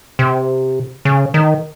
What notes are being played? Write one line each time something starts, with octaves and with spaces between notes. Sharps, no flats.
C3
C#3
D#3